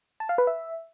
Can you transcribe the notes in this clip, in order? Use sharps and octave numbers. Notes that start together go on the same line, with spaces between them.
A5
F5
B4
E5